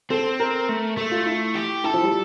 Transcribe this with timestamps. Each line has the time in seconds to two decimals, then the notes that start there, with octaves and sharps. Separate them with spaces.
0.10 C4 A4
0.40 A#4
0.69 A3
0.97 A3 A4
1.12 F4
1.26 E4
1.55 G4
1.84 E4 A4
1.94 F3
2.04 G3